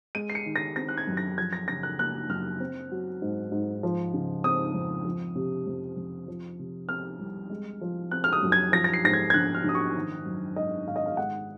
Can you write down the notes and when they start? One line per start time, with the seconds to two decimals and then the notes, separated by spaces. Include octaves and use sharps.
0.15 G#3 D#7
0.30 C7
0.35 C#7
0.46 D#3
0.56 A#6
0.76 C4 A#6
0.89 F#6
0.98 G#6
1.07 F#2
1.17 A#6
1.38 F3 G#6
1.53 A#6
1.68 C#3 A#6
1.83 F#6
1.98 A#3 F#6
2.29 F#2 F6
2.60 C4
2.91 F#3
3.22 G#2
3.52 G#2
3.83 F3
4.14 C#3
4.44 C4 D#6
4.74 F2
5.05 F3
5.35 C3
5.67 F2
5.97 F2
6.28 F3
6.59 C3
6.89 C4 F6
7.20 C2
7.50 G#3
7.81 F3
8.11 C4 F#6
8.24 F6
8.33 D#6
8.42 F#2
8.52 G#6
8.72 F3 A#6
8.84 A#6
8.94 C7
9.04 G#2 A#6
9.13 G#6
9.30 G#6
9.34 A#1 F#6
9.55 F6
9.64 A#1 D#6
9.75 C#6
9.96 D#3
10.26 F#2
10.56 G#1 D#5
10.87 G#1 F5
10.96 D#5
11.06 F5
11.17 G#3 F#5